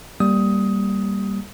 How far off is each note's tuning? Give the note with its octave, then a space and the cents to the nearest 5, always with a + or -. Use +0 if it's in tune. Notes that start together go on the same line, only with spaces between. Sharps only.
G3 +0 A#3 +0 D#6 +15